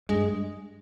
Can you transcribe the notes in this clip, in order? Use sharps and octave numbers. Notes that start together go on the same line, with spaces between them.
G2 G#3